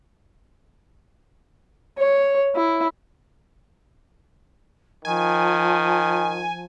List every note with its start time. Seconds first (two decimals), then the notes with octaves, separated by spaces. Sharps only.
1.99 C#5
2.55 E4
5.05 D#3 F3 G#5